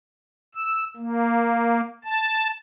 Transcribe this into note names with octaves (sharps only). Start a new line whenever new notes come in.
E6
A#3
A5